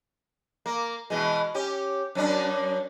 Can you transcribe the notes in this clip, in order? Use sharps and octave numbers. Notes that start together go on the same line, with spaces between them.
A#3
B2 E3 G#3
C#4 G4
F#2 C#4 D4